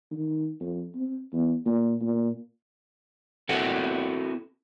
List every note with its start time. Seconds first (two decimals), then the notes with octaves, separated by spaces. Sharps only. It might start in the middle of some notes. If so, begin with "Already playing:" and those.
0.11 D#3
0.61 F2
0.96 C4
1.33 E2
1.66 A#2
2.02 A#2
3.49 C4 E4 F#4 A4 A#4